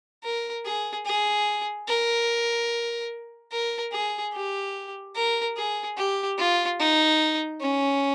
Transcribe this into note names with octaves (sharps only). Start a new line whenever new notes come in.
A#4
G#4
G#4
A#4
A#4
G#4
G4
A#4
G#4
G4
F4
D#4
C#4